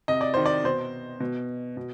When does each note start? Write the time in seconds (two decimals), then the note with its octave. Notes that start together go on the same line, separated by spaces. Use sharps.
0.08 C3 D#5
0.21 D5
0.34 D#3 C5
0.46 D5
0.64 B2 C5
1.20 B2
1.77 B2